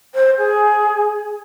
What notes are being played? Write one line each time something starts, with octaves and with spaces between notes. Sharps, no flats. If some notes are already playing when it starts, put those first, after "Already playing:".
C5
G#4